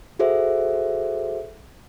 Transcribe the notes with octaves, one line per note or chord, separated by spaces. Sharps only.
F#4 G#4 A4 C5 E5